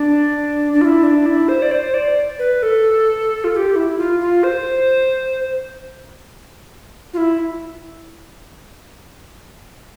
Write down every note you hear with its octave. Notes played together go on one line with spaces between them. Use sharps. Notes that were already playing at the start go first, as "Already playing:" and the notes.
Already playing: D4
D4
F4
E4
D4
E4
C5
D5
C5
D5
B4
A4
F4
A4
G4
E4
F4
F4
C5
F4
E4